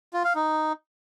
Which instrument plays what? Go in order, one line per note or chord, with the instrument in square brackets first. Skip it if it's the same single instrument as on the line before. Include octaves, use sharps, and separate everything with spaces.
[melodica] F4
F5
D#4